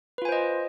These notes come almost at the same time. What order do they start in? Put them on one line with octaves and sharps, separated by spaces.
B4 F4 G#5 C5 D#5